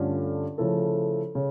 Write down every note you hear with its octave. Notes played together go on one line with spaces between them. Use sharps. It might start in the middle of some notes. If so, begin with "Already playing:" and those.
Already playing: G2 D3 A3 C#4 F4
C#3 F3 A3 E4 A4
C#3